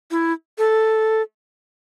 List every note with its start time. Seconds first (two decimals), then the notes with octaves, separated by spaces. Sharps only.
0.11 E4
0.58 A4